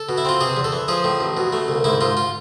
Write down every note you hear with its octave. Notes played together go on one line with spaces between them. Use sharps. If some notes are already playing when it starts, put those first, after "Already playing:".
Already playing: A4
B2
E4
C4 F4
C3 G#4
E2
A4
E3
F3 G#4
A2
A1
B2
A3
C2
G#2 E4
G#2 F4
F4